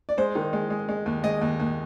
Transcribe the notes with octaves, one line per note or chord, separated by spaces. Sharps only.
D5
G#3 C5
D#3
G#3
G#3
G#3
D#2
G#3 D#5
D#2
D#2